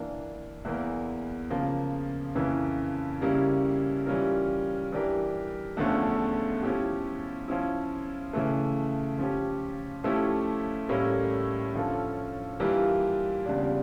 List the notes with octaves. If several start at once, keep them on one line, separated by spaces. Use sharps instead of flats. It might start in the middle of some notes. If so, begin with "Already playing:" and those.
Already playing: E3 A#3 D4
E2 E3 A#3
C#3 F3 A#3
F2 C#3 E3 A#3 C#4
C#3 G3 A#3 C#4 E4
E3 G3 C#4 F4 A#4
E3 G3 D4 G4 A#4
E2 D3 F3 A3 C#4
F3 C#4 E4 G4
F3 C#4 E4
C#3 E3 A3
F3 C#4 G4
F3 A3 C#4 E4 G4
A2 G3 A#3 C#4 E4
D3 F3 C#4 F4 A4
E3 G3 A#3 D4 F4
E2 C#3 G3 D4 F4